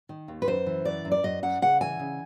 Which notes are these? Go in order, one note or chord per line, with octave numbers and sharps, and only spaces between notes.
D#3
D#2
B4
F#2 C5
E3
F#2 D5
F#2
D5
F#2 D#5
F#2 F#5
C#3 F#5
E3 G#5
C#3